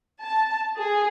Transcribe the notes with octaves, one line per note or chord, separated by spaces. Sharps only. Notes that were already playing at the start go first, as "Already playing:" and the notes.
A5
G#4